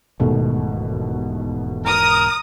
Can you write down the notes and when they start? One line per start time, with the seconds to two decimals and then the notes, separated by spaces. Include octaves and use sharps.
0.20 E1 D#2 G#2 B2 A3
1.86 A#4 A#5 D#6